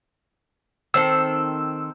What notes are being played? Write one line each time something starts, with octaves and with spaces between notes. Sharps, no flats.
D#3 C4 A4 E6